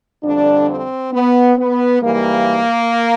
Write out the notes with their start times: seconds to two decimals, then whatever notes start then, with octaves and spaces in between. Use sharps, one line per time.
0.24 F2 D3 G3 D4
0.68 C4
1.12 B3
1.57 B3
2.02 G#2 E3 G3 A#3